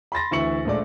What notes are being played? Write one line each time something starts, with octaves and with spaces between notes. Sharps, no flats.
B5 C6 A6 A#6
D2 E3 E4 C#6 C#7 F#7
A#1 G#3 A3 D5